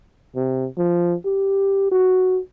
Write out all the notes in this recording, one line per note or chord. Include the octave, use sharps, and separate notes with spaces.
C3
F3
G4
F#4